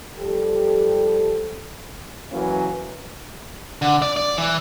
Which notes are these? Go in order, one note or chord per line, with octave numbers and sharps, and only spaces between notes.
F3 G3 G4 A4
E3 F#3 A#3 C#4 B4
D3
D5
D5
E3